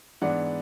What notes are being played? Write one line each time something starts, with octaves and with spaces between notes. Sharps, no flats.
G#2 E3 B3 D4 D5 F#5